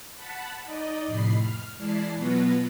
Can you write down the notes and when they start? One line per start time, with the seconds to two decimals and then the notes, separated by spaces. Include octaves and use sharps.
0.15 F#5 A5 B5
0.65 D#4 D5 D#5
1.06 F2 A2 C3 B5 C7
1.40 F6
1.77 E3 G#3 E4 D5 A5 C7
2.17 B2 F#3 B3 F4 B4 A#6